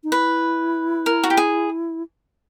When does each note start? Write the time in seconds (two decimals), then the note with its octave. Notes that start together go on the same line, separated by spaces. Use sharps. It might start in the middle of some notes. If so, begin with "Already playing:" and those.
0.04 D#4
0.12 E4 B4
1.06 A#4
1.24 F#4
1.30 G4
1.37 G#4